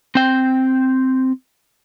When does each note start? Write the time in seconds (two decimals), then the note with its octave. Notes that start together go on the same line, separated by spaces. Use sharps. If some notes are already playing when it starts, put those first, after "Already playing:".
0.15 C4 G5